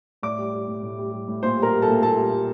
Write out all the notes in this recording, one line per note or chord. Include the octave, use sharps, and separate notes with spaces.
A2 D5 D6
G3
G3
A2
A2
G3
G3
A2
A#2 C5 C6
G3
A#4 A#5
G3
A4 A5
A#2
A#2 A4 A5
G3
G3